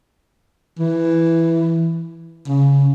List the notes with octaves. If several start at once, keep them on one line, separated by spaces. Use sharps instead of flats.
E3
C#3